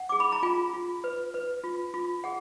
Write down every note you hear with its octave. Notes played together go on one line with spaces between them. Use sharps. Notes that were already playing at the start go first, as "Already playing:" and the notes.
Already playing: F#5
G#4 D6
B5
A#5
F4 G#5
F4
B4
B4
F4
F4
G#4 F#5